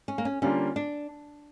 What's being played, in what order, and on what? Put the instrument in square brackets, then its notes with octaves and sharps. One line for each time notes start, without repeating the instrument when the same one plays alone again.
[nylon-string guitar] C#4
A#3
C#4
[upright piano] D3 G3 A#3 D4 F4 [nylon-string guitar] C#4
[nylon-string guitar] D4